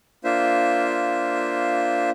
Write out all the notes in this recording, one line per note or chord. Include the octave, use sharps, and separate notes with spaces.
A#3 D4 F4 C5 E5